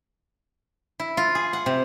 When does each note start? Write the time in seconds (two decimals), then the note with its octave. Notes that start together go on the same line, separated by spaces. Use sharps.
0.99 E4
1.17 F4
1.35 G#4
1.53 F#5
1.66 C3